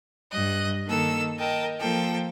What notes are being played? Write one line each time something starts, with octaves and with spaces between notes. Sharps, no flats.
G2 D#5 F#6
D#3 A#3 A4 E6
A#4 D#5 G5 A5
F3 A#3 A4 G5